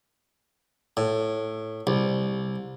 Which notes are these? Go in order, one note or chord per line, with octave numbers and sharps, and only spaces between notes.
A2
C2